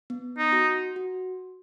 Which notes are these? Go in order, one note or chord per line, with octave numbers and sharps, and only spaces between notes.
B3
D#4
F#4
F#4